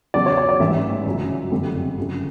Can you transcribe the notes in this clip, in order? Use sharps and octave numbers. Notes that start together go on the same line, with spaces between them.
E2 C#3 F#3 D5
C#5
C#5
D5
A1 G#2 E3 G3 E5
G1 F#2 C#3 F#3
F#1 F2 D3 G3
G1 F#2 C#3